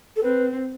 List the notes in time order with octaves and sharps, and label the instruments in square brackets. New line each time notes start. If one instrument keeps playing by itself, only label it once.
[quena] A4
[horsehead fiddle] C4 [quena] B4